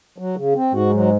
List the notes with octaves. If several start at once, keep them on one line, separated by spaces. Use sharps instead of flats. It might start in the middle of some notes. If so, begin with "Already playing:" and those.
F#3
C#3
C4
G#2 F#4
F#3